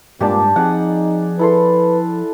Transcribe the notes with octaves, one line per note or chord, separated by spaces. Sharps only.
G2 A#2 G#3 D4 G4 D5 A5
F3 C4 D#4 G#4 F#5
E4 A4 B4 C6